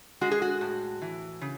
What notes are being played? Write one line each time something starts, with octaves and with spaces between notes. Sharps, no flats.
G#3 F#4
G#4
F#4
A2
E3
C#3